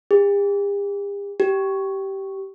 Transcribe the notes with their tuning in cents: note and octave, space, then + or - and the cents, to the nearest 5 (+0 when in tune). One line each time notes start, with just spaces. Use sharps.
G4 +45
G4 -15